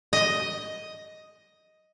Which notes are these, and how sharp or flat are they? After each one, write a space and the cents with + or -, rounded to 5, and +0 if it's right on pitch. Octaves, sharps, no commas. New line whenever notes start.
D#5 +5